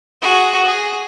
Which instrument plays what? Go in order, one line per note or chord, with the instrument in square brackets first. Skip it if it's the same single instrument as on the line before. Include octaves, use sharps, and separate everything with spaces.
[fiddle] F#4 G#4
G#4